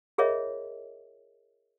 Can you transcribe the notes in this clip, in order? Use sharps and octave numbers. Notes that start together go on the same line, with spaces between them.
F4 G#4 A#4 C#5 D#5 E5